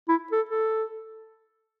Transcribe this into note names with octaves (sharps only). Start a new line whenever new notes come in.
E4
A4
A4